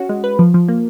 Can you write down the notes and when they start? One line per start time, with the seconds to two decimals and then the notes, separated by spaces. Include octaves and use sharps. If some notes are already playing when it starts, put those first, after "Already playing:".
Already playing: C#4 F#4
0.09 G#3
0.24 B4
0.39 F3
0.54 F3
0.69 A#3